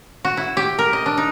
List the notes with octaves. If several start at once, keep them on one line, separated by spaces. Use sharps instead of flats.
F#4
E4
G4
A#4
D#5
D4
D#4